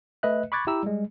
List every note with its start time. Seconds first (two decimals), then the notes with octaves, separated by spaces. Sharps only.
0.23 A3 B4 D#5 E5 F#6
0.52 B5 C#6 D6 F#6 G#6 A6
0.67 E4 G4 A#5 E6
0.83 G3 G#3